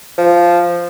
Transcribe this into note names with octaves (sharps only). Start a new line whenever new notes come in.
F3